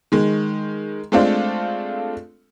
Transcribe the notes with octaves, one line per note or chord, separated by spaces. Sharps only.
D#3 G#3
G#3 A3 C4 D4 F4 A4